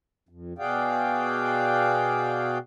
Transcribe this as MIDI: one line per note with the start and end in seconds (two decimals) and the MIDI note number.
0.29 0.53 41
0.58 2.58 47
0.58 2.58 66
0.58 2.58 68
0.58 2.58 74
0.58 2.58 77
0.58 2.58 79